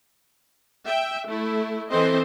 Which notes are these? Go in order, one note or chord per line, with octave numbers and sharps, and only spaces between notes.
E5 G5
A3 E4
E3 C4 A4 C5 D#5